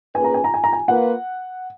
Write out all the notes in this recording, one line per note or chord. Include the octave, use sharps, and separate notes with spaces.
A#3 C#4 G#4 B4 G#5
A#5
G#5
A#5
G#5
A#5
G#5
A#3 F4 B4 F#5